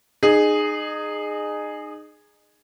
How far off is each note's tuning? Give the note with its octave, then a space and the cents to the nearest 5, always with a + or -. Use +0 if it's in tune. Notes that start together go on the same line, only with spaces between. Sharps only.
D#4 -30 G#4 +0